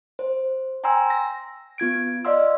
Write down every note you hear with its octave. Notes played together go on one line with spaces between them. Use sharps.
C5
G5 G#5 A#5 C6 E6
A#6
B3 F4 G#6 D7
D5 D#5 F5 C6 E6